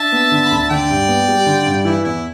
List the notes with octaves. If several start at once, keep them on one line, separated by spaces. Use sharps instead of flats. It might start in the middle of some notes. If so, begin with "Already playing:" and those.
Already playing: D4 E5 A5
B3
D3
B5
D2
A5
D3 D5 G5
G2
B3
G3
D3
G2
E3 E4
E2 E4